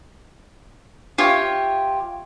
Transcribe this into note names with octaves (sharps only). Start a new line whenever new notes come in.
F4 G4 C#5 E5